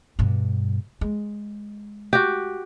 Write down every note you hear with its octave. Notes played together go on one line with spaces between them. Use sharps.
G2 B2
G#3
F#4 G4